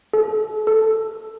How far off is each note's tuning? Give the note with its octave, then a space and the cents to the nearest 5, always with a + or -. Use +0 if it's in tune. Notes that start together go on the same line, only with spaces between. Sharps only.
A4 -40
A4 +0